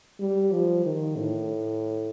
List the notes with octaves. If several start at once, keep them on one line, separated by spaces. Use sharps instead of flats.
G3
F3
D#3
A2